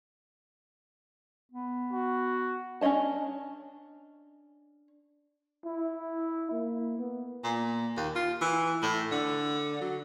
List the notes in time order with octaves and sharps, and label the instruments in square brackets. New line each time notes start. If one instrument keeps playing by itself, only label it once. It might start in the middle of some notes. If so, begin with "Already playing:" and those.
[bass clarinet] B3
[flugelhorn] F#4
[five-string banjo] C#4 D4 C#5 D#5 A5
[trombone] E4
A#3
B3
[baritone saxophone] A#2
D#2
F4
E3
A2
D3
F#3